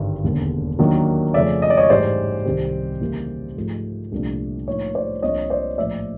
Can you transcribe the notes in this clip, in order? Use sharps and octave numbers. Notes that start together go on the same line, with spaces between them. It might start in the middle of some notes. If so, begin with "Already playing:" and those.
Already playing: G#1 G2 D3 G3
E1 D#2 D3
D#2 D#3 F#3 A#3 D4
F2 C#3 F3 A3 C#4 D5 E5
D#5
D5
C#5 D#5
A1 G#2 E3 G3 C5 D5
C2 C3 D#3 G3 C4
D#2 C#3 E3 G3 A#3
G#2 F3 A3
C2 A#2 F3 A3 D4
A2 F3 A#3 D#4 C#5
C5 D5
C2 C3 F3 A#3 D4 C#5 D#5
C5 D5
A#1 A2 F3 D5 E5